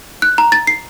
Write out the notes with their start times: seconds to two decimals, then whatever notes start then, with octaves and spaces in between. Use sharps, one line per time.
0.22 F#6
0.38 A#5
0.52 A6
0.67 C7